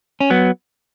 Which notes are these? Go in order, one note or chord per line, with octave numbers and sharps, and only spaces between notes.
C#4
F#3 B3